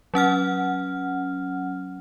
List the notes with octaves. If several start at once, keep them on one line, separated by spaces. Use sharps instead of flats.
F#3 C#4 F#5 F6